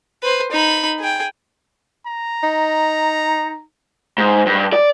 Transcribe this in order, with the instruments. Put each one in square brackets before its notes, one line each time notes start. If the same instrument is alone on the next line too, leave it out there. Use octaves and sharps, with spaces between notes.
[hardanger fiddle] B4 C5
D#4 B5
G#4 G5
[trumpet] A#5
[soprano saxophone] D#4
[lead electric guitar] G#2
G2
D5